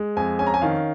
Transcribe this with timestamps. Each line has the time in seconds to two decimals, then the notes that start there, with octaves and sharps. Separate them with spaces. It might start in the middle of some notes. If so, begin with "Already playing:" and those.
Already playing: G#3
0.16 F2 G#5
0.39 C#4 G#5
0.47 A#5
0.54 G#5
0.62 D#3 F5